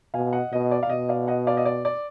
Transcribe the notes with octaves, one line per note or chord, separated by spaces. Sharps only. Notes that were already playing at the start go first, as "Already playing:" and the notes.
B2 F5 G#5
D#5 F#5
B2 D#5
D5
F5
B2 D#5
D5 F5
D#5 F#5
D5 F5
D#5
D5
D5